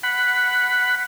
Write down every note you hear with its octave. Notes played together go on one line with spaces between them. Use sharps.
F#5 B5